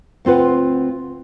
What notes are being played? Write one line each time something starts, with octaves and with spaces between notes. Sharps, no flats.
D2 C4 F4 B4 F#5